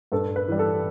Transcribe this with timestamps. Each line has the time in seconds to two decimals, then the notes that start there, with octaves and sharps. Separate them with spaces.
0.12 G2 A4
0.36 B4
0.48 E3 G3
0.59 A4